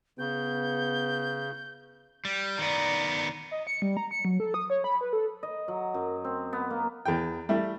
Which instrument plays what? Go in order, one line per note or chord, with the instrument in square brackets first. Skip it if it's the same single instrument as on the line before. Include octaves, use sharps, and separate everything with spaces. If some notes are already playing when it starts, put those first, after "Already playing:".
[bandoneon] C#3 [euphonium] B3 [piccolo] G6
[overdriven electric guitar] G3
[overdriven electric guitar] D#3 B3 [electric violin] D5 A#5
[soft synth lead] D#5
C#7
G3
A#5
C#7
F#3
A4
D#6
C#5
B5
B4
A4
[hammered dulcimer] D#5
F#3
F#2
C4
B3
A#3
[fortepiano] E2 G5
G3 A3 E4